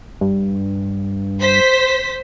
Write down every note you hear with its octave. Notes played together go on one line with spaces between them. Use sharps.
G2
C5 B6